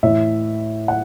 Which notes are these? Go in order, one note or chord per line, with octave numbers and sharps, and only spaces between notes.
A2 E3 E5
F#5